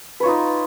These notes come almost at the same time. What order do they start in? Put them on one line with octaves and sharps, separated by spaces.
B4 C#5 F4 D#4